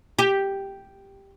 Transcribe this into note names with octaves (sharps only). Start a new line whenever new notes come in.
G4